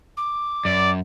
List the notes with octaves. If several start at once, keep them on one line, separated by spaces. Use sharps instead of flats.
D6
F#2 D5